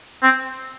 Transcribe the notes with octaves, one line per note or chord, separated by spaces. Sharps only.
C4